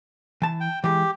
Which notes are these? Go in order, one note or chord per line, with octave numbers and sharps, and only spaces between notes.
E3 A5
G5
E3 G#3 G4